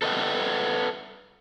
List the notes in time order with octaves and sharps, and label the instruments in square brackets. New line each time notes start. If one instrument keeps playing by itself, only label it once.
[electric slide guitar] A4 B4 D#5 E5 F#5 G5